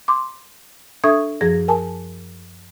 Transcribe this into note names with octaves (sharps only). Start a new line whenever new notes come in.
C6 D6
D4 A4 E5 C#6 D#6 G#6
F#2 F3 G#4 G#6 A#6
A#4 G#5 A5